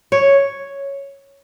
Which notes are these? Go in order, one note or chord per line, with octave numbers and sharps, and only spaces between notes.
C#5